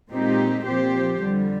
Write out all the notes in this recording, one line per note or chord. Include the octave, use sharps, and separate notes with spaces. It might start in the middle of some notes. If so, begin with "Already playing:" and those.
A#2 G#3 C4 D#4 G4
A#2 F3 C4 G4 C5
F2 D3 G3